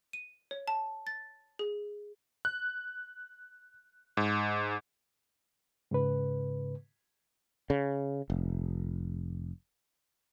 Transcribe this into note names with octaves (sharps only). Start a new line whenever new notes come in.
D#7
C#5
A5
A6
G#4
F#6
G#2
G#2 C#3 B4
C#3
F1